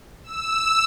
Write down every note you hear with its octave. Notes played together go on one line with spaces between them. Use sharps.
E6